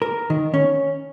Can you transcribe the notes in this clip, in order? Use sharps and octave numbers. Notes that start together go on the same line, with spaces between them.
A#4
D#3
C#4